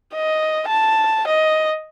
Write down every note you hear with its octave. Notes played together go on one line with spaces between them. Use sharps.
D#5
A5
D#5